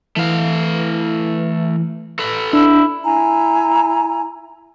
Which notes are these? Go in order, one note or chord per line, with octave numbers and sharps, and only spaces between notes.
E3 A3 F5
A4 B4
D4 E4
E4 G#5 A#5